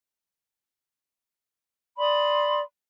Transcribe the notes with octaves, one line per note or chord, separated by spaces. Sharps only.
D5 B5 C6 D#6